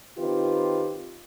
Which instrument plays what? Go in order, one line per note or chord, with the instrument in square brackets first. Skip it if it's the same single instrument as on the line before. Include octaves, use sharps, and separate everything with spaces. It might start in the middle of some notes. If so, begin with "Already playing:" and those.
[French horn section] D#3 C4 F4 G4 B4